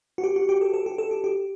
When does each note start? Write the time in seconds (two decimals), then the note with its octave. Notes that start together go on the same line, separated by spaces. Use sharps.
0.18 F#4
0.24 G4
0.36 F#4
0.49 G4
0.61 A4
0.74 A4
0.86 G4
0.98 A4
1.11 G4
1.24 G4